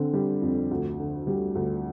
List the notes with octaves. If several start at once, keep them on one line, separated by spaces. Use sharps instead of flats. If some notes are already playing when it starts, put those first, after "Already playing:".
Already playing: D3 C4
G3
F2
D2
D3
G3
D2